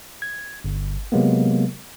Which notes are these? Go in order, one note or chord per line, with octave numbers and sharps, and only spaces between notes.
G#6
G1
C3 F#3 G#3 A#3 B3